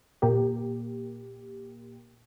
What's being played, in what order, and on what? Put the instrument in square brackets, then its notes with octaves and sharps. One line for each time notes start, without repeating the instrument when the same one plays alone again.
[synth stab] A#2 A#3 G4